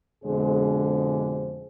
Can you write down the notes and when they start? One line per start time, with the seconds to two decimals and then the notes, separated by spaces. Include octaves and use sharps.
0.24 F2 B2 D3 G#3 G#4 C5